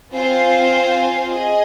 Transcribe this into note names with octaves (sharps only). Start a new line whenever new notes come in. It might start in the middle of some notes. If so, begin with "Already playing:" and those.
C4 F4 C5 F5 G#5
G#4 D#5 G#5